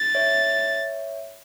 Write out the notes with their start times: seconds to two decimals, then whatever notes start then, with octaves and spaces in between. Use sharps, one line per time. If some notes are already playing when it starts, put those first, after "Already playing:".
Already playing: A6
0.15 C#5 E5